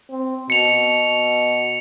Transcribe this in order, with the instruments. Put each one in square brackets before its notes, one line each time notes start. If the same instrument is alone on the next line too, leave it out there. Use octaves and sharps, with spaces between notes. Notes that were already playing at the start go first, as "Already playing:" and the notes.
[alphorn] C4
[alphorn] B2 [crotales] C#7 F7